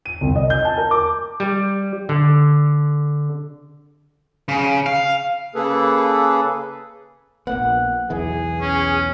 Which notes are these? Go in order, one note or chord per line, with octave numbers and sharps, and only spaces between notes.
D#7
C2
D#5
G6
A5
A#4
D6
G3
D3
C#3
F5
C#3 A#3 G#4 A4 B4
A#1 A#3 B3 F#5
B1 E2 E3 G#4
C#4